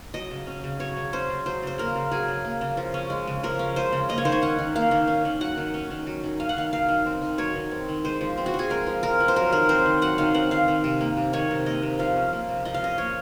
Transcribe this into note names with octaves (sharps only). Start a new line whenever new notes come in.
F#3 D#5
C#3
C#4
C#3
F#3 C#5
C#3
C#4 C5
C#3
F#3 C5
C#3 C5
A#3 A#4
C#3
F#3 G#4
C#3
A#3
C#3
F3
C#4
G#3
C#3
F3 A#4
C#4
G#3 C5
C#3
A#3 D#5
C#5
D#3 C5
C#5
C#4 F#5
D#3
A#3 F5
D#3
C#4
D#3
F#3 F#5
D#3
C#4
D#3
F#3
D#3
C#4 F5
F#5
D#3 F5
F#3 F5
D#3
C4
D#3
F#3 C#5
D#3
C4
D#3
G#3 C5
F3
C4
F#4
F3
G#4
G#3 A#4
F3
C4 A#4
F3
C5
F#3 A#4
D#3 A#4
C4 C5
D#3
F#3 F#5
D#3 F5
C4 F#5
D#3 F5
D#3
C3
A#3
C3
D#3 C#5
C3
A#3 D#5
C3
F3 F5
C#4
A#3
C3
F3 D#5
F5
C#4 D#5
A#3 C#5